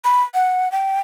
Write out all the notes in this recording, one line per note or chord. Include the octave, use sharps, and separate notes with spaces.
B5
F#5
G5